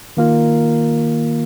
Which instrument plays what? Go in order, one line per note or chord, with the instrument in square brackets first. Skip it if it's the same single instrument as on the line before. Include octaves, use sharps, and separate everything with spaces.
[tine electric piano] D#3 A#3 F4 A#4